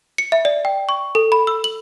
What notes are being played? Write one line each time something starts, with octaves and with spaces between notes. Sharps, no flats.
C#7
E5
D5
G5
C#6
A4
B5
E6
F#7